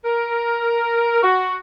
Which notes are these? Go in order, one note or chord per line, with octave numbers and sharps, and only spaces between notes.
A#4
F#4